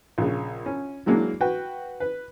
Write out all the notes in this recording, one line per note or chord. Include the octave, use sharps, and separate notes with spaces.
A#1 C#3
C#4
E3 F#3 G#3 A#3 D4
F#4 B4 G5
B4